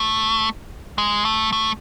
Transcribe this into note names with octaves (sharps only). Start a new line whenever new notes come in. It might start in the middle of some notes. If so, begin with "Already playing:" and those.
Already playing: A3
G#3
A3
A3